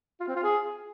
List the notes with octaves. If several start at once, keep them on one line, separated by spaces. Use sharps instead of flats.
F4
C4
F4
G#4